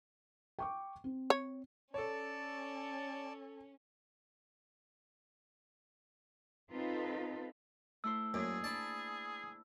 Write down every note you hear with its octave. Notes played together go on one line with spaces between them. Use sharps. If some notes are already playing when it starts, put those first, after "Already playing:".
G5 C#6 D6
C4
C#5
C#4 A4 C#5 D5 A5
C4 D#4 F4 A4 B4
A3 E4 C5 E6
F#2 A#3 G#4 D5
D4 D5 A5 B5